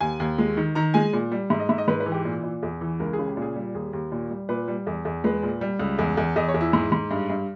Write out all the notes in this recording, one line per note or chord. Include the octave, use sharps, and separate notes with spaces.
D#2 G#5
D#2
G#3
D#3
D#3 A#5
G#3 G#5
A#2
G3
G#2 E5
D#5
G#2 E5
D#5
G#2 B4
B4
E3
G4
A#2
A#2
E2
E3
C#2 A#4
G#4
C#3
G4
A#2 G#4
G3
D#2 G#4
D#2
A#2
G3
A#2 B4
G3
E2
E2
G#3 B4
A#2
G3
C#2
E2
E2
E2 D#5
C#5
E2
E4
G#2
G#2
G2
G2